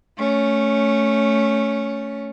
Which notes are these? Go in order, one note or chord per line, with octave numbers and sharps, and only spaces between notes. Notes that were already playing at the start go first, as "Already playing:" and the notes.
A3 C#4